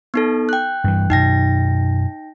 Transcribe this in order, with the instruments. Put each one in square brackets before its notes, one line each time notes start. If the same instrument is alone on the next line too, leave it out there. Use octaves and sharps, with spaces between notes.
[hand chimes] B3 D#4 A4
G5 F#6
[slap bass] G2 E3
[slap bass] F#2 B2 [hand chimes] D#4 G5 A#6